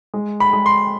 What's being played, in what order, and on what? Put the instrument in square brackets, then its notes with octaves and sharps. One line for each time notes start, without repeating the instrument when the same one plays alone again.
[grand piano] G#3
B5
G#3
C6